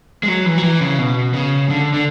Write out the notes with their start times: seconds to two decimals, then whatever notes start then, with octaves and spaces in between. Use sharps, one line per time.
0.23 G#3
0.28 F#3
0.46 E3
0.58 F#3
0.63 E3
0.81 C#3
0.98 B2
1.34 C#3
1.70 D3
1.94 D3